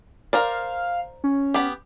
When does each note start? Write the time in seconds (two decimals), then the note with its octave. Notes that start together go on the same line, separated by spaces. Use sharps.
0.33 A#4 C5 D5 F5
1.24 C#4
1.54 B3 G4